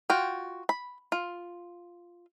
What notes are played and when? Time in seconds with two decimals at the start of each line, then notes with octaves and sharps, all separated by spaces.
0.10 F4 F#4 G5
0.69 B5
1.12 F4